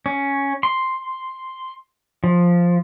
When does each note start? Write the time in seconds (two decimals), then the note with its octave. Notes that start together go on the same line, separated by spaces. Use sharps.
0.06 C#4
0.63 C6
2.24 F3